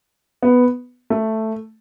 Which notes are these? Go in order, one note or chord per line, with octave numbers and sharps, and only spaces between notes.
B3
A3